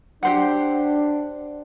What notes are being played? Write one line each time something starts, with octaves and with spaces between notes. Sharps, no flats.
D4 G4 C5 F#5